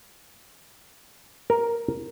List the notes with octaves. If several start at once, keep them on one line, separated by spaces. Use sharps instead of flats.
A#4